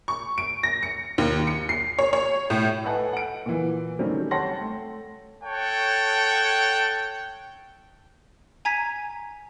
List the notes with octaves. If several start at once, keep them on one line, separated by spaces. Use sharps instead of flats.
C#6
D7
A#6
C#7
D#2
C#7
C7
C#5
C#5
A2
A4 B4 D#5 F#5 G#5 A5
F#5 D7
A#2 E3
D#3 F#3 G3 A3 C4 C#4
C#5 F#5 G5 A5 C6 A#6
A3
A4 C#5 F#5 G5 A5
G#5 A#5 G#6 B6 D#7